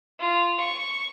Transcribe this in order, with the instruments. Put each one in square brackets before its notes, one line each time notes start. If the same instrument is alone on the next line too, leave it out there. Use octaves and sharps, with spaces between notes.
[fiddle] F4
C#6